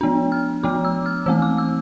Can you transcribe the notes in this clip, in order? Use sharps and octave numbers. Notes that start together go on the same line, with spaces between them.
F3 B3 D4
F6
F3 B3 D4 D6
E6
F6
E3 A3 C4 E6
D6
E6